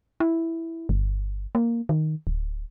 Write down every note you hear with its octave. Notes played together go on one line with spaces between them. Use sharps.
E4
G1
A#3
D#3
D1